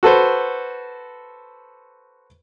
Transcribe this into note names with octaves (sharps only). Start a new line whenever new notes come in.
F#4 A4 B4 C5